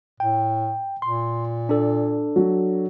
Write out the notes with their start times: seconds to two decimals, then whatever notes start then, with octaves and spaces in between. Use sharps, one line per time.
0.20 A2 G5
1.02 A#2 C6
1.69 D4 A4
2.36 F#3